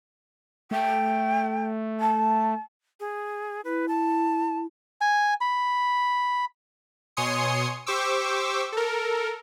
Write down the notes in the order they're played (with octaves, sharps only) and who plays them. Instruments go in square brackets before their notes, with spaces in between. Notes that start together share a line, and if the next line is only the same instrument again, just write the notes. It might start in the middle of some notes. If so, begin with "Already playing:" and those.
[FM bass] A3 [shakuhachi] G5
[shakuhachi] A5
[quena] G#4
[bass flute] E4 [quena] B4
[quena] A5
[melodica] G#5
B5
[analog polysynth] B2 C#5 G#5 C6 D#6 C#7
G4 C5 C#6 D6 E6
A4 A#4